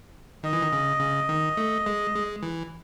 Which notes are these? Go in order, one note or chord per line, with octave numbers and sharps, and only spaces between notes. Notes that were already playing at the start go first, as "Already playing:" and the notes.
D#3 D#5
E3
D#3
C#3
C#3
D#3
A3
G#3
G#3
E3